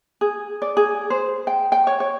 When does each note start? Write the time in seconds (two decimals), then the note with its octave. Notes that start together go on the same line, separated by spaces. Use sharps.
0.21 G#4
0.62 D5
0.77 G#4
1.10 C5
1.47 G5
1.72 G5
1.87 C#5
2.00 C#5